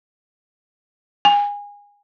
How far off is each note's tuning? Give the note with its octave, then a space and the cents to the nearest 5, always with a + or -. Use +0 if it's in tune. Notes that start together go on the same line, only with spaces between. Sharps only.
G#5 -25